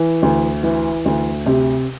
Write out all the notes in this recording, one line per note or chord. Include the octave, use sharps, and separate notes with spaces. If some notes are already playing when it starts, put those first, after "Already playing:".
Already playing: E3
D2
E3
D2
C3